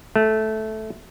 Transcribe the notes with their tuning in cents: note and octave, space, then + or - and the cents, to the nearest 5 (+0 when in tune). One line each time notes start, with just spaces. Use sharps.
A3 -10